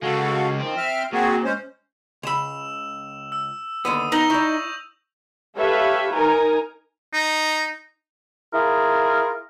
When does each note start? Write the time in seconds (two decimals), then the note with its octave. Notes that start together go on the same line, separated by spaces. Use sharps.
0.03 C#3 G#3 F#4 A4 F5
0.59 D#3 F3 C4
0.77 E5 F6
1.13 A#2 C4 F#4 G#4
1.44 G#3 C#4 C5
2.23 C#2 B5 E6 E7 F7
3.32 E6
3.85 D#2 D3 B3 D#6 D#7
4.12 B3 D#4 A#6 F7 F#7
4.30 E4 D5 C#6 G6 F7
5.57 G4 A4 B4 C#5 E5 F5
6.12 D#4 A#4 G#5 A#5
7.13 D#4
8.53 E4 F4 G#4 A#4